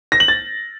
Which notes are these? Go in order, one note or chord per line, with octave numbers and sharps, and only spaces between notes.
A#6
F#7
A6